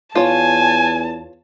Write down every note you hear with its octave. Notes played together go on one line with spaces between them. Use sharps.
E2 F4 C#5 G#5 A5